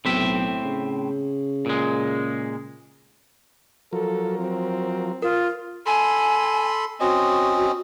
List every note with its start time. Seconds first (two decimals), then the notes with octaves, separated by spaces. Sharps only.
0.05 B1 A2 C4 E5
0.65 C#3
1.66 A#2 G#3
3.93 F3 F#3 A4 A#4
4.39 C4
5.22 F4 A#4
5.86 A4 G#5 B5 C6
7.00 C4 C#4 F#4 D#5